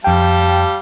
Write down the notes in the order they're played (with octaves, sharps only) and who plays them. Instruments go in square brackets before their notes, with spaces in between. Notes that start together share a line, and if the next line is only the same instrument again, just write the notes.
[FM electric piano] F2 G5 [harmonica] G3 F5 A5